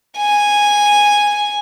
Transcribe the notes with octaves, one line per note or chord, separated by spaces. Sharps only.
G#5